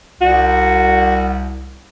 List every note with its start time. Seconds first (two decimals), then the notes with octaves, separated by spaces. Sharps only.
0.21 C2 F#4